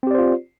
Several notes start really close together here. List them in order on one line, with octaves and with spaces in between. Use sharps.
C4 G4 D5 C5 F4